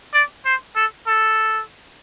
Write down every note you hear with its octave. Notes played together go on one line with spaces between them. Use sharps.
D5
C5
A4
A4